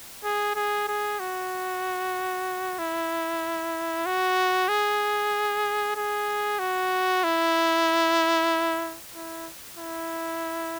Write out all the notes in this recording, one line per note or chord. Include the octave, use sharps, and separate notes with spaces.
G#4
G#4
G#4
F#4
E4
F#4
G#4
G#4
F#4
E4
E4
E4